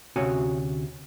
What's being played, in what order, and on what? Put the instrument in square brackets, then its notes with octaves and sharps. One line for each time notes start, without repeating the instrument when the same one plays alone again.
[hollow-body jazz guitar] D2 C3 C#4 F#4 C#5 G#5